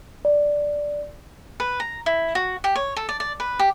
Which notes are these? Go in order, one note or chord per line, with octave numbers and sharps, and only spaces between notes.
D5
B4
A#5
E4
F#4
G4
C#5
A4
D5
D5
B4
G4